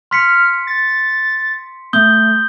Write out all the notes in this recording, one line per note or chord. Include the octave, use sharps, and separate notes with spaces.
C6 F6 B6 C#7
A6
A3 D#6 G6 G7